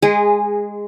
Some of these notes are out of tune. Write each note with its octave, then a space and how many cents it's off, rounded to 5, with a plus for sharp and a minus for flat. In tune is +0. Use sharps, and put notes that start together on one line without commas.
G#3 -5 G#4 -20